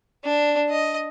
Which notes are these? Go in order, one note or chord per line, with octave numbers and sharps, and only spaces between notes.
D4
D#5